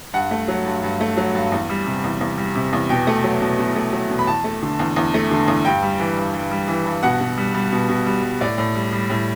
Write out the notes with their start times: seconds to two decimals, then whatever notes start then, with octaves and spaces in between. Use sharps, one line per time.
0.13 G2 F#5
0.31 A3
0.48 F#3
0.65 G2
0.83 G2
1.01 A3
1.17 F#3
1.35 G2
1.52 E2
1.69 G3
1.86 C3
2.04 E2
2.21 E2
2.38 G3
2.55 C3
2.73 E2
2.89 B2 G5
3.07 A3
3.24 F#3
3.41 B2
3.59 B2
3.76 A3
3.93 F#3
4.10 B2
4.19 B5
4.27 E2 A5
4.44 A3
4.62 D3
4.79 E2
4.96 E2
5.14 A3
5.31 D3
5.48 E2
5.65 G2 G5
5.82 G3
6.00 E3
6.17 G2
6.34 G2
6.51 G3
6.68 E3
6.85 G2
7.03 B2 F#5
7.20 B2
7.37 G3
7.54 G3
7.72 B2
7.89 B2
8.06 G3
8.23 G3
8.41 A2 D5
8.58 A2
8.75 G3
8.92 G3
9.10 A2